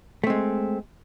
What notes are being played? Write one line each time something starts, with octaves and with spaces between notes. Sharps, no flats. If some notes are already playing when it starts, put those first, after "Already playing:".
G#3 A3 C4